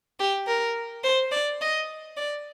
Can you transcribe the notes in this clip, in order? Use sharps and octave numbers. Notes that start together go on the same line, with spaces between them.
G4
A#4
C5
D5
D#5
D5